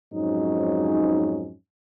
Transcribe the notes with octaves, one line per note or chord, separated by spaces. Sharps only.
F2 G#2 F#3 C#4 D#4